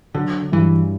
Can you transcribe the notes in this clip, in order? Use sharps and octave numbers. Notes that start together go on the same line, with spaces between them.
D3 F#3
G2 E3